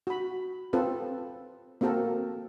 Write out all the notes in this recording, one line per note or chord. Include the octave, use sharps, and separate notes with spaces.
F#4 B5
C4 F4 A4 B4
A#3 C4 F#4 A4 A#4